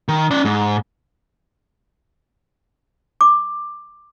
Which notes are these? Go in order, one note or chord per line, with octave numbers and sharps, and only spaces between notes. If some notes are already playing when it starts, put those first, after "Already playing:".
D#3
C#4 D5
G#2
D6